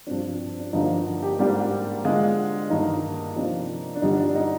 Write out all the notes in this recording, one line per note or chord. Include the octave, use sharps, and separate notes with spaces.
G2 F3 C4 D4
D4
G2 D3 F3 A#3 D4 D#4
G4
G#2 G3 A#3 D4 G4
D3 G#3 D4 F4
G2 D#3 A#3 D#4
C3 F3 A#3 D4 D#4
D4
G2 D3 G3 D#4
D4
D4
D#4